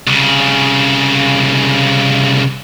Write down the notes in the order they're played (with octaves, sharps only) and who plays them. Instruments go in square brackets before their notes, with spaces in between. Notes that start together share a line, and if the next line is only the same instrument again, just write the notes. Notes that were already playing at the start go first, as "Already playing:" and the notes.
[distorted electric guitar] C2 C#3